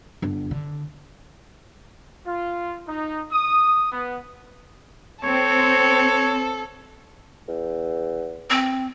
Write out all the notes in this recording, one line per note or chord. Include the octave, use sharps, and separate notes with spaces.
G1 D4
D3
F4
D#4
D#6
B3
C4 A4 C#5
E2
C4